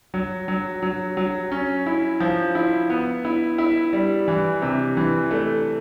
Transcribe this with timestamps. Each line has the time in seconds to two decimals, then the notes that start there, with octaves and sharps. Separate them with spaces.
0.14 F#3
0.48 F#3
0.83 F#3
1.17 F#3
1.51 C#4
1.87 E4
2.20 F3
2.55 E4
2.90 B3
3.25 E4
3.58 E4
3.93 G3
4.28 E3
4.62 C3
4.97 E3
5.31 A3